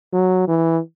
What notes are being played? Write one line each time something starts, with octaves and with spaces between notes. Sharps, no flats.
F#3
E3